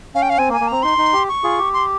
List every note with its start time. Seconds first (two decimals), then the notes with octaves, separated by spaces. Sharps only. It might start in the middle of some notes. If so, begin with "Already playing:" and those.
0.15 C#4 F5
0.22 G5
0.30 F5
0.38 C4 G#5
0.49 A#3
0.53 G#5
0.61 A#3
0.68 C4 A#5
0.83 D#4 C6
0.98 D#4
1.13 G4
1.28 C#6
1.43 F4 G#4
1.59 G4
1.73 C6